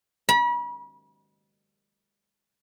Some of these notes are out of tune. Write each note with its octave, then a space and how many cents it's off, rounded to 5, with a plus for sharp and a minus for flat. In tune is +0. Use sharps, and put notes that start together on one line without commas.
B5 -40